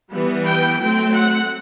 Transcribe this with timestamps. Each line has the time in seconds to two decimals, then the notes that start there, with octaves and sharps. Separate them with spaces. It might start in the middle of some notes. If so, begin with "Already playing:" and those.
0.12 E3 G3 B3
0.46 G5
0.80 F#3 A3 C4 G5
1.15 F#5